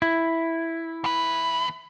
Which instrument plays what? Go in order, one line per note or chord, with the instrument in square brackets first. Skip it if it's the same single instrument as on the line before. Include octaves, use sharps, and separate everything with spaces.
[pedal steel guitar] E4
[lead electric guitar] D#2 B4